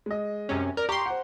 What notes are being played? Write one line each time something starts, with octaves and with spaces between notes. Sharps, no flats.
G#3 D#5
F#2 C3 C#4
A#4 D5
G4 A#5 C6 C#6
C5 F#5